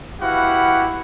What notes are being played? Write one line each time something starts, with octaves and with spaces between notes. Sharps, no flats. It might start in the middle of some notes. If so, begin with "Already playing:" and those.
E4 F#4 G4 B4 F5 F#5